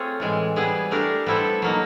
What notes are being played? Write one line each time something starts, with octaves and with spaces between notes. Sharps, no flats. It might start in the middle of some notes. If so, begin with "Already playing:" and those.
Already playing: A3 C4 F4 G#4 C#5
A2 E3 G#3
G3 B3 E4 G#4
A3 D4 G4 A#4
G3 B3 E4 A4 C5
F#3 A#3 D#4